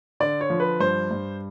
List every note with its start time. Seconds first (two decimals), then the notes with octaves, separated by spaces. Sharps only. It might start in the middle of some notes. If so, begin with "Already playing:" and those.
0.20 D3 D5
0.41 C#5
0.50 F3
0.60 B4
0.80 G2 C5
1.11 G2